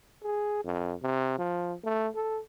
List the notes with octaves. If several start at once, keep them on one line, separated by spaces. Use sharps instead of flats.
G#4
F2
C3
F3
A3
A4